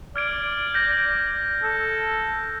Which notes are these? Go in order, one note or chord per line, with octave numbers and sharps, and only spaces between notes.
D5 F6 G#6 D7
G6 A#6
A4